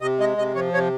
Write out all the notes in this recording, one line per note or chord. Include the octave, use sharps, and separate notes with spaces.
C3 D#5
G#3 D#5
C3 D#5
F3 C#5
C3 C#5